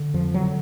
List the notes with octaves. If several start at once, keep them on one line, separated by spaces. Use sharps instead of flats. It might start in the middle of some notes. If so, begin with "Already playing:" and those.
Already playing: D3
F2 F3
D3 F#3